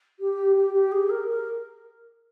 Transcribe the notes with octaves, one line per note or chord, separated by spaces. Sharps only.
G4
G4
G4
G#4
A#4
A#4